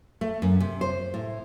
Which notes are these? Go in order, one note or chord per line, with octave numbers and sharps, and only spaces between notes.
A3
F#2
C3
C5
A2